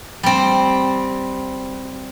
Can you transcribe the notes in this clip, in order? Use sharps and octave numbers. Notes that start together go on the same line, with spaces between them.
G3 C4